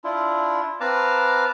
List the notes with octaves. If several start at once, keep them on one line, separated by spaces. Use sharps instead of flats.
D4 E4 F4
C4 B4 F5 A5 A#5 D6